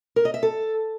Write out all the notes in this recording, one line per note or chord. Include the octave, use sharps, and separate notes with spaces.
A#4
D#5
E5
A4